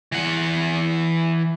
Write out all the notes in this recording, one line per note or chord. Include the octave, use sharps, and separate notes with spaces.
E3 F#5